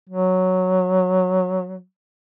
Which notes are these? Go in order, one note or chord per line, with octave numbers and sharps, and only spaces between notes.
F#3